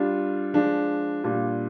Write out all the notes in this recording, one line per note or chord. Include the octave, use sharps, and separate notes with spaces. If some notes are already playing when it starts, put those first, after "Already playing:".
Already playing: G3 D4 F4
F3 G#3 D4
A#2 G3 D4 F4